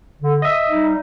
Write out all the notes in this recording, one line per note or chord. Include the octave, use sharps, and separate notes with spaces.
D3
D#5 E5 D#6
G3 D#4